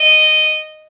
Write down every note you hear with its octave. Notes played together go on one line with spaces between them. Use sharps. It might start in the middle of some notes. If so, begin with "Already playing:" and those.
Already playing: D#5